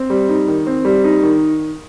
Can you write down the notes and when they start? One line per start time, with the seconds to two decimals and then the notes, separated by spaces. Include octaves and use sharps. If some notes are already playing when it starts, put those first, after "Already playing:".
Already playing: C4
0.10 G3
0.29 D#4
0.48 D#3
0.67 C4
0.85 G3
1.04 D#4
1.23 D#3